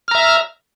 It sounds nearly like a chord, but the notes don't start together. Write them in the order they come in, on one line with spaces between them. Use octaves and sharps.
F6 A#5 E5